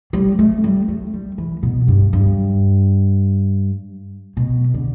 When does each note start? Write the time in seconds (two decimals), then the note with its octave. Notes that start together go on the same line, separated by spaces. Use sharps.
0.13 G3
0.39 A3
0.64 G3
0.88 A3
1.13 G3
1.38 E3
1.63 B2
1.88 G2
2.13 G2
4.37 B2
4.74 D3